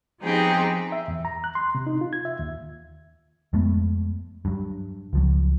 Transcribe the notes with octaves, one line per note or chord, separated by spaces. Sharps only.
F3 B3 C4 D#4 G4 G#4
E5
E2
A#5
F#6
C6
C3
D#4
F4
G#6
E5
D#2
F2 G#3 A3 B3
G2 F#3
C#2 F3 F#3